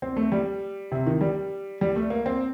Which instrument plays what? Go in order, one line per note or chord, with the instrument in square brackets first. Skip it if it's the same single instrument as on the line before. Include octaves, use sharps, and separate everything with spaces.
[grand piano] C4
A3
G3
C3
D#3
G3
G3
A3
A#3
C4